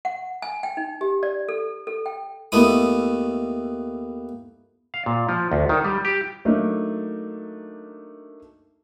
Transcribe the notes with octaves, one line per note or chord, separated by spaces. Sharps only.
F#5
G#5
G5
D#4
G4
D5
A4
A4
G5
D#2 A3 B3 E4 D#6
F5
A#2
F3
D2
D#3
G3
G4
F#3 A3 A#3 D4 D#4